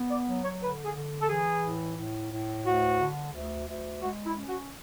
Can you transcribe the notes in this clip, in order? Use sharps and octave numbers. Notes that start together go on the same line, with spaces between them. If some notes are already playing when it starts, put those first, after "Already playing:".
Already playing: B3
D5
F#3
C#5
D3 B4
G#4
D3
A4
E3 G#4
A2
A2
A2
D2 F#4
D3
D2
D2
G#3 F#4
E4
C#4
F#4